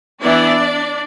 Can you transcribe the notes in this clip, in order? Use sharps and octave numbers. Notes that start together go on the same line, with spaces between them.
E3 B3 D4 E4 D5